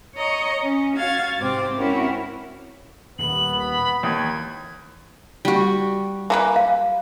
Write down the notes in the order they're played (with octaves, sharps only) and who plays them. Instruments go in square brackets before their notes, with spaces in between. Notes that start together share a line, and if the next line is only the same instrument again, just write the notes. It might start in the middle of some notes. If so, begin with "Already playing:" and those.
[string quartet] C#5 D#5 A#5 C#6
C#4
F#4 F5 F6 G#6 A6
G#2 C3 C4 D6
C4 C#4 E4 F#4 A#4
[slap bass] D#1 D#2 [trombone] B3 [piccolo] F#7
[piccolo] B5
[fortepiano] D#2 [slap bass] E3 [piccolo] G#6
[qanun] G3 F#4
[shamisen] E3 A#3 B4
[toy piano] F5